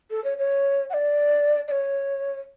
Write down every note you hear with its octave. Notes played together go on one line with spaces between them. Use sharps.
A4
C#5
C#5
F#5
D5
D5
C#5